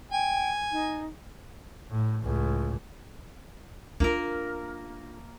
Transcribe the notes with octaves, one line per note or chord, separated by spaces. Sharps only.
G5 G#5
D#4
A2
C#2 A2
A#3 D4 F4 A#4